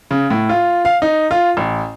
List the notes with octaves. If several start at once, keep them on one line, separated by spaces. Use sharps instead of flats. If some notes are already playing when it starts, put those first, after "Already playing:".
C#3
A2
F4
F5
D#4
F4
A1